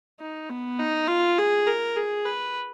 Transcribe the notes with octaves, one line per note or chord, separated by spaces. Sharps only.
D#4
B3
D#4
F4
G#4
A#4
G#4
B4